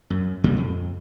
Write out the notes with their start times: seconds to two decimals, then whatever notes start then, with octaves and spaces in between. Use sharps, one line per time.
0.10 F#2
0.44 C#2 A#2 C#3 G3
0.56 F2